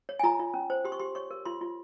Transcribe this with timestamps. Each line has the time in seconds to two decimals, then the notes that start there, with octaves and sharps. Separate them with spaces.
0.09 C#5
0.19 G#5
0.23 F4 A#5
0.39 F4
0.54 C#4
0.70 C5
0.85 G4 C6
0.92 C#6
1.00 G4 C6
1.15 C#5 C#6
1.31 A#4
1.46 F4 C6
1.61 F4